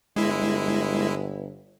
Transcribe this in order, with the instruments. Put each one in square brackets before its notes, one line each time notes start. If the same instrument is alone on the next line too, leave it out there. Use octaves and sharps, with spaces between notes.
[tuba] G1 [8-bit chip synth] G#3 E4